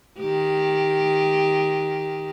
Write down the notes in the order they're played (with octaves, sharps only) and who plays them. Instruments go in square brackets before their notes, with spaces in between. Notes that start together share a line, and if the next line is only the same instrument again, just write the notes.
[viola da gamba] D#3 G4